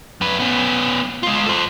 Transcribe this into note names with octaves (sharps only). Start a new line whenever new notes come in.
F#2 B4
B3 C#4
G#3 F4
A4 C5